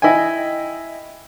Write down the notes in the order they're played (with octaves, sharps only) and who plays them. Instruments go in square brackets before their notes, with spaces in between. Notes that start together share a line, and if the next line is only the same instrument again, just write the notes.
[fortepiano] E4 D#5 G5 G#5